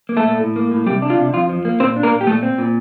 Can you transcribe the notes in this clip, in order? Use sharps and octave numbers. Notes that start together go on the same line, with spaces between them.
A#3
A3 A4
A#2
A2
A#3
A2
C3 G3 G4
D4
F4
C3
F2 F4
F3
A#3
A#2 C4 C5
D4
A#3 A#4
A#2
G4
A#2 A3 A4
C4
A#2